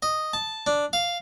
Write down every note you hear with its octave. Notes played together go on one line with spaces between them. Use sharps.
D#5
A5
D4
F5